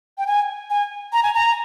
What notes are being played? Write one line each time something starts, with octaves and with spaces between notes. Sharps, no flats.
G5
G#5
G#5
A#5
G#5
A#5